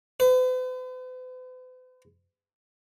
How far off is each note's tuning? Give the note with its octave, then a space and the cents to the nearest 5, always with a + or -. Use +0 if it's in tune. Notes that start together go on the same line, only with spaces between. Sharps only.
B4 +45